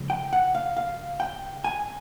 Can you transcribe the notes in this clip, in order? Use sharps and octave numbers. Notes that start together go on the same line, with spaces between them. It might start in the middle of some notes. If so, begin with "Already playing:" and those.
Already playing: C#3 F3 G#3
G5
F#5
F5
F5
G5
G#5